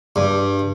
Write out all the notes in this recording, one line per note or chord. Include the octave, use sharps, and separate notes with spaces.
G2